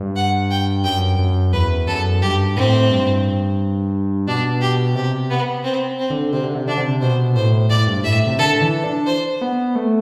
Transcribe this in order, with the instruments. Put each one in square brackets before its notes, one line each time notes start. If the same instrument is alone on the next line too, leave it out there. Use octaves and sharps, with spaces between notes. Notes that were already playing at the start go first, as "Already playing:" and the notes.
Already playing: [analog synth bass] G2
[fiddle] F#5
G5
[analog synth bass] F#2 [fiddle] G5
[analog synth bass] F#2
[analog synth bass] E2 [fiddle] B4
[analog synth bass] F#2 [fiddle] A4
[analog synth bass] G2 [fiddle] G4
[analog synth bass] A2 [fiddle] C4
[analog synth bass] G2
[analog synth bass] B2 [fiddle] D4
[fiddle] G4
[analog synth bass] C3 [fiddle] G4
[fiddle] B3
C4
C4
[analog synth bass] D3
[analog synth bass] C3 [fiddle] C4
[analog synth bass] D3
C3
[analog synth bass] D3 [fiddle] D4
[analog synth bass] C3
[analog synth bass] B2 [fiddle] C5
[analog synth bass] A2 [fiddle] C5
[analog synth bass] A2 [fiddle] D5
[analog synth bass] G2
[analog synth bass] A2 [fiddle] E5
[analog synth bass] C3
[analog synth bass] D3 [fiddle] A4
[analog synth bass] E3
D4
[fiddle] C5
[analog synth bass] B3
A3